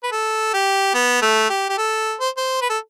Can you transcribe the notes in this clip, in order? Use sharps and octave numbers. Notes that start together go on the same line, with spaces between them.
B4
A4
G4
B3
A3
G4
G4
A4
C5
C5
B4
A4